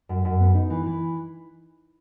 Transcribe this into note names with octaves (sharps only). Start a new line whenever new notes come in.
F#2
F#2
B3
D#4
E3
E3